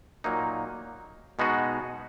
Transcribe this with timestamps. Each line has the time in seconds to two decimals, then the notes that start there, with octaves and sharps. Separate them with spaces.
0.24 A#2 F#3 A#3 D#4
1.39 B2 G#3 B3 D#4 F#4